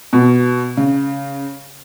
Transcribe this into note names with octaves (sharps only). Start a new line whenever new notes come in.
B2
C#3